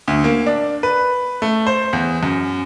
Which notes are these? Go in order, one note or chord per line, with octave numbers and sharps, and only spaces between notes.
D2
A#3
D4
B4
A3
C5
E2
F#2